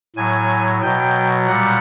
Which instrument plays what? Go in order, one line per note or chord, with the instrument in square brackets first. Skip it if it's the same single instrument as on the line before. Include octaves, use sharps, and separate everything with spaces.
[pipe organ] A2 F#3 G#5
B2 F#3 G5
A#2 G3 F#5